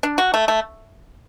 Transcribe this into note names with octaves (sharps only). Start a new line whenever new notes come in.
D4
F#4
A3
A3